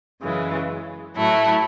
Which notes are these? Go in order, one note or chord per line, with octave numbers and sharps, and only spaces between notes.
F#2 C#3 E3 G#3
A2 F#3 A3 E4